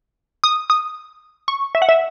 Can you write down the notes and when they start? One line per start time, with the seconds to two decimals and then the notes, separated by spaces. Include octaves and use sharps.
0.44 D#6
0.70 D#6
1.48 C#6
1.75 E5
1.82 F#5
1.89 E5